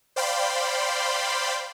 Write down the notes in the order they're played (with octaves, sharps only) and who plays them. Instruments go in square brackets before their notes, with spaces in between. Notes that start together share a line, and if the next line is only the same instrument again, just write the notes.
[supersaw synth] C5 D5 F5 G5 B5 C6